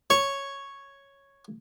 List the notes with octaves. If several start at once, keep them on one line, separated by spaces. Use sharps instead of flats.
C#5 C#6